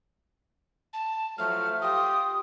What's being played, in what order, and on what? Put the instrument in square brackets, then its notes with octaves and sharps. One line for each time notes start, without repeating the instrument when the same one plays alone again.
[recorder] A5
[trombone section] F3 F#3 A3 [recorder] F6
[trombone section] F4 G4 [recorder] D#6